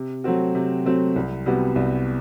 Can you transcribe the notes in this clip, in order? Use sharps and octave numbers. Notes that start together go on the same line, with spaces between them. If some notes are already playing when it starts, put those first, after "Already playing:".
Already playing: C3
F#3 A3 C4 F#4
C3
F#3 A3 C4 F#4
C2
C3 G3 B3 F#4
C2